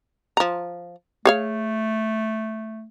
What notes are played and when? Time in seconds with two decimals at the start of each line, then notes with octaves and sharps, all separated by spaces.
0.37 F3 A#5
1.26 A3 G#4 C#5 F5